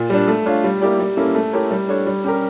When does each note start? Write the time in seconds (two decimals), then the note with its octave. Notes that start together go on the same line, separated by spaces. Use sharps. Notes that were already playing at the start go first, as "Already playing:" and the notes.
Already playing: A#2
0.10 G3 D4
0.28 A3
0.45 D4 F4 C#5
0.64 G3
0.81 A#3 E4 G4 D5
0.99 G3
1.17 A#3 C#4 E4 A4
1.35 A3
1.53 E4 G4 A#4 C#5
1.71 G3
1.88 D4 A4 C#5
2.06 G3
2.24 C#4 G4 A#4